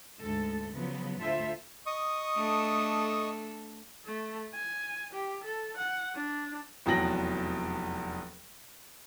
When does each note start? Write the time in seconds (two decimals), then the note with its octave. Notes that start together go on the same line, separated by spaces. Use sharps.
0.21 D2 G#2 G#3 A4
0.72 C#3 F3 F#3 B3
1.20 D2 A2 F4 A4 C5 E5
1.86 D#5 C#6 D#6
2.36 A3 D4 A4
4.06 A3
4.54 G#5
5.13 G4
5.44 A4
5.77 F#5
6.15 D4
6.86 F1 E2 F#3 G5 A#6 F#7